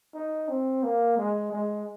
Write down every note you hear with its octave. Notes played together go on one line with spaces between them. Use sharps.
D#4
C4
A#3
G#3
G#3